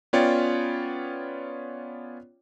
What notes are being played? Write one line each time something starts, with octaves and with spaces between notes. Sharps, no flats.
B3 C#4 F4 C#5 D5 G5